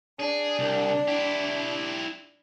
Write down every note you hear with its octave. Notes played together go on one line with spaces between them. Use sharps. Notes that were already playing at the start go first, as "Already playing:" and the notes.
D4 G#4
C2
E4 G4